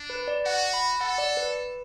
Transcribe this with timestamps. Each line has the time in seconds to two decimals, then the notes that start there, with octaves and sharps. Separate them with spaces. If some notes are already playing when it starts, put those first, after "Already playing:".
Already playing: D4
0.10 B4
0.28 D5
0.46 F#4 F#5
0.73 B5
1.01 A4 F#5
1.18 D5
1.37 B4